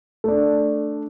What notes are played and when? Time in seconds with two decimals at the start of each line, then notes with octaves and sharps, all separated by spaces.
0.24 A3 D4